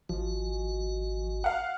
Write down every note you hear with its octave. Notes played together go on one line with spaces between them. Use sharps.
G#1 F3 F#4
F5 F#5